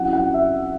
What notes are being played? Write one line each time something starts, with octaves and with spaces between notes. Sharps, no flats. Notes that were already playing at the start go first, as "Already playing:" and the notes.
Already playing: F#3 C#4 E4 F#5
F#5
E5